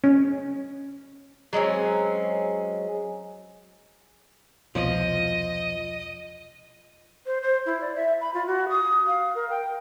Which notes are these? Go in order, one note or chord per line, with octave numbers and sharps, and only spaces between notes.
C#4
F#3 G#3 C4 C#4
E1 C2 B2 F3 D#5
C5
C5
E4
D5
E5
B5
F4
F#4
D#6
F5
A#4
G5